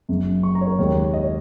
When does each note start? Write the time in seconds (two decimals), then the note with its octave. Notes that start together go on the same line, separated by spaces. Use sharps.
0.09 F#1 F#2 C#3
0.43 C#6
0.55 A#5
0.61 C#5
0.67 A#4
0.79 D#2 C#3 G#3 C#4 C#5
1.14 D#5
1.24 C#5